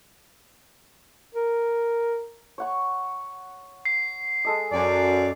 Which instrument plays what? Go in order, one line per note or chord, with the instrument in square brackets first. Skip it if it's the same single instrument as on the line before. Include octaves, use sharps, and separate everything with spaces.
[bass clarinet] A#4
[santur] C#5 F#5 C#6
[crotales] C7
[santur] G#3 A4 D#5
[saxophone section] F#2 D5